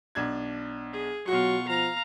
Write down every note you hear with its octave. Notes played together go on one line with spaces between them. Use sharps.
B1 D4 G#6
G#4
B2 F#3 F4 F#4 C#6
F3 F5 A#5